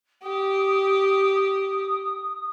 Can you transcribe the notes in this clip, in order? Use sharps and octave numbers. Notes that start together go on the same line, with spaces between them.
G4 D#6